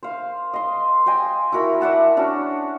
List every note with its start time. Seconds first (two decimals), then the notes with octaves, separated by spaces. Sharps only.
0.03 C5 F5
0.53 D#5 C6
1.06 C5 D#5 G5 G#5
1.52 E4 F#4 A#4 B5
1.80 D5 E5 F#5 A5
2.17 C#4 D4 F#4